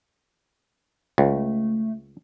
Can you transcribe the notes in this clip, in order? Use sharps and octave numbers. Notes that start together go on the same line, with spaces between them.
C#2 A3